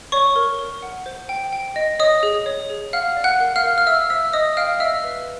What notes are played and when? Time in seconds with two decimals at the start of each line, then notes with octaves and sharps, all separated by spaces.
0.12 C#5 D5 C#6
0.36 A#4
0.59 A#4
0.82 F#5
1.06 C5
1.29 G5
1.53 G5
1.76 D#5
2.00 C#5 D#5 D#6
2.23 G#4
2.46 C#5
2.70 G#4
2.93 F5 F#5 F6
3.17 D5
3.24 F#5 F#6
3.40 A#4
3.56 F5 F6
3.63 A#4
3.78 F6
3.87 E5 E6
4.10 C5 E5 E6
4.33 C5 D#5 D#6
4.57 F5 G5 F6
4.80 D#5 E5 E6
5.04 B4